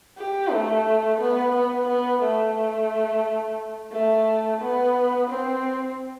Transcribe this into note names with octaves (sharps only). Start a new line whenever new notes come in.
G4
A3
B3
B3
B3
A3
A3
B3
C4